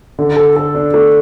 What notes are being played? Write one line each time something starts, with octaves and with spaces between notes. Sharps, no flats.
D3
A4
A4
D4
A3